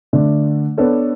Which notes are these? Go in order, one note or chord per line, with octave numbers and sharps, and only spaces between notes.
D3 A3 D4
B3 D4 A4 C#5